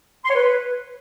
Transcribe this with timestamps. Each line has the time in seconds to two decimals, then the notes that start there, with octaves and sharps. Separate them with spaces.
0.25 C6
0.30 C#5
0.35 B4